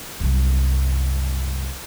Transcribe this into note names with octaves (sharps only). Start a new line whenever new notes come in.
C2 F#2